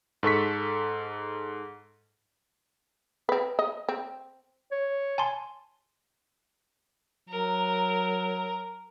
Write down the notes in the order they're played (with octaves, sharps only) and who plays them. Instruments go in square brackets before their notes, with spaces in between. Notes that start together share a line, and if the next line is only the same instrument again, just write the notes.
[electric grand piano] G#2 A4 C#6 B6
[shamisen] C4 B4
D#5
C4
[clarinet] C#5
[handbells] G#5 A5 C6
[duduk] F#3 [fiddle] A#4